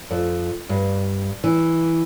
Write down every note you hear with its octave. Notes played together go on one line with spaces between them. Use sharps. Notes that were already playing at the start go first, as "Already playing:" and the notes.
F2
G2
E3